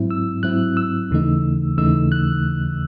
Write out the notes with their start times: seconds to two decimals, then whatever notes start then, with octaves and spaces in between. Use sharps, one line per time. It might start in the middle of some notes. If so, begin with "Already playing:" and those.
Already playing: G#2 F#3 C4 E4
0.10 E6
0.43 G#2 F#3 C4 E4 F#6
0.77 E6
1.11 D#2 C#3 E3 A3 D#4
1.77 D#2 C#3 E3 A3 D#4 E6
2.12 F#6